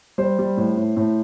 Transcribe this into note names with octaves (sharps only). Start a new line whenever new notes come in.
G3 C5
G3
A2
A2
A2